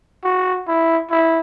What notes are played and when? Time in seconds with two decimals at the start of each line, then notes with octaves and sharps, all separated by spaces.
0.24 F#4
0.67 E4
1.10 E4